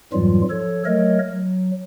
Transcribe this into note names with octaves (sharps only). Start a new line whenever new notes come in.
F2 G#2 E3 F#3 G3 F4
F3 A4 C#5
F#3 A3 A#4 C#5 D#5
F#3